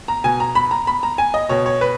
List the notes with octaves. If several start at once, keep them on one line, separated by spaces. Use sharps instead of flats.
A#5
B2 G#5
A#5
B5
A#5
B5
A#5
G#5
D#5
B2 C#5
C#5
B4